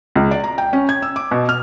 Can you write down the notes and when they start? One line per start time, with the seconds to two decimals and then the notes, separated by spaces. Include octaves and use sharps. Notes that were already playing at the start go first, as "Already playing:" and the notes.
0.15 C#2
0.31 D5
0.44 A#5
0.58 G5
0.73 C#4
0.89 G#6
1.02 E6
1.16 D6
1.31 B2
1.49 F6